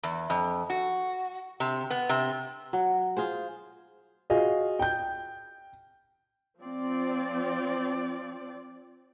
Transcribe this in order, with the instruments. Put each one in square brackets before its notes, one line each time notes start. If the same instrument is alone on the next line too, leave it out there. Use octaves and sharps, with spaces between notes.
[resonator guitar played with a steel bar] E2
F2
F#4
C3
B3
C3
[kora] F#3
F4 G#4 C5
[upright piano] F4 F#4 G#4 D#5 F5
G5 G6
[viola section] F3 C4 D5